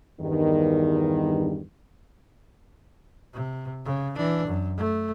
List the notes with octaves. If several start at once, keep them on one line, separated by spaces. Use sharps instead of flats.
E2 G2 D#3
C3
C#3
E3 D4
F#2
A3